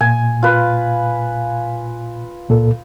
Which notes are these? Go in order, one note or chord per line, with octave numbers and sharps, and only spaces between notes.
A#2 G#5
F4 B4
C#2 A#2 A4